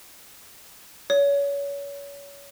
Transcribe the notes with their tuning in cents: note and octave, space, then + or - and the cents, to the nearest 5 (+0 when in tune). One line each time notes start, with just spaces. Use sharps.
C#5 +30